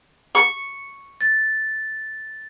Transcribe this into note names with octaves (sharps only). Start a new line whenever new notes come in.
C#6
A6